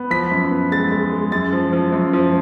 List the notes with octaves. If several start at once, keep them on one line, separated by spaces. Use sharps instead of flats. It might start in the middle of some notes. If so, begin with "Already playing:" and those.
Already playing: B3
F3 B6
F#2
B3
G#3 A6
G#3
G#3
F#2 A6
F3
F3
F#2
F3